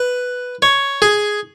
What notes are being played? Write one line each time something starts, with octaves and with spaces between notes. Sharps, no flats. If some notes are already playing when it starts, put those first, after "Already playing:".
Already playing: B4
C#5
G#4